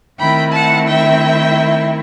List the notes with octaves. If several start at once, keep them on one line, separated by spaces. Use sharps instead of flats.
D#3 A3 C4 E4 G5 B5
F#5 A5
E5 G5